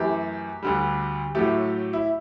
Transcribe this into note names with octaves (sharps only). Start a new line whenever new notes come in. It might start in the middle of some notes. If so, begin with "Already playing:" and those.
Already playing: F#2 E3 A3 G4
D2 D3 G3
A2 F#3 A3 G4
E4